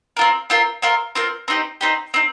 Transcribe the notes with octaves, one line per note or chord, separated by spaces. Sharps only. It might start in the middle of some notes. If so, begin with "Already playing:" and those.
C4 F4 A#4
C4 F4 A#4
C4 F4 A#4
C4 F4 A#4
C4 D#4 G4
C4 D#4 G4
C4 D#4